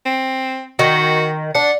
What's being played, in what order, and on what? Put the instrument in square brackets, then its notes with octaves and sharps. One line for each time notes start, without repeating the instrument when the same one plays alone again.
[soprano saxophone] C4
[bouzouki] D#3 [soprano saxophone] F#4
[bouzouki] D4 [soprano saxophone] F#5